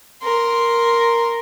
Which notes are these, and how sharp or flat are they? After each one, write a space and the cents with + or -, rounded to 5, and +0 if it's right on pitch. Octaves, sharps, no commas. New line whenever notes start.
A#4 +0 C6 +0